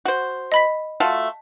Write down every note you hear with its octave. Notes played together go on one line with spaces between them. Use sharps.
F#4 C5
D#5 B5 B6
A3 F4 F#4 A5